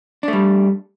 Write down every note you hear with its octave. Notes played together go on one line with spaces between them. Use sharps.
G3 A3 D4